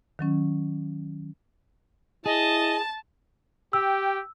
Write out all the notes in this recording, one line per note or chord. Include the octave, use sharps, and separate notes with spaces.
D#3 F#3 C#4
E4 G#4 D#5 A5
G4 G5 E6